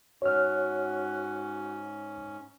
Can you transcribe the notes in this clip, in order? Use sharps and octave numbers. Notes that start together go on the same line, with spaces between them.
G#2 C#4 F#4 C#5 F6